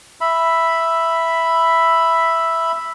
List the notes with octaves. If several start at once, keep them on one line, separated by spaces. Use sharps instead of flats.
E5 B5